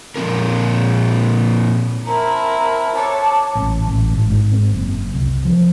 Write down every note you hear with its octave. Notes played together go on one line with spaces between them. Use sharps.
A#2 F3 C4 A#4
C4 E4 A#4 A5 A#5
A4 C#5 A5 D6
A1
A1
G#1
G#2
C4
F#1
C2
F3